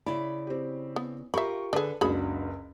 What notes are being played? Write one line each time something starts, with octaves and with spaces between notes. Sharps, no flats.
C#3 E4 D5 B5
C4 G4
B3
F4 G4 A#4 E5 B5 C#6
D3 D4 G#4 A4 B4
F#1 C#2 D4 F#4 G#4 C#5 B5